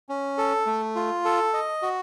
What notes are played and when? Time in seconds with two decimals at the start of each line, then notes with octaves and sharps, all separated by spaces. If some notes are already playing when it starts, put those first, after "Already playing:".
0.09 C#4
0.38 A4
0.66 A3
0.95 F4
1.25 A4
1.54 D#5
1.82 F#4